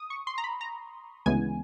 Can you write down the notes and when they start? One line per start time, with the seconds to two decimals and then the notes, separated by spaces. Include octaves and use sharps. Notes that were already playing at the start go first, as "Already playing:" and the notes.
Already playing: D#6
0.10 C#6
0.27 C6
0.38 A#5
0.44 B5
0.61 A#5
1.26 D2 C#3 E3 G#3 B3 G#5